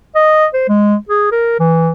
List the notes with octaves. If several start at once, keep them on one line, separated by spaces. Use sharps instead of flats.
D#5
C5
G#3
G#4
A#4
E3